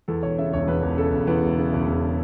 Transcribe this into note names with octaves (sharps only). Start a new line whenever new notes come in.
E2 A4
E1 C#5
C#3 E5
E1 C#5
E2 B4
E1
C#3 A4
E1
E2 B4
E1
C#3
E1
E2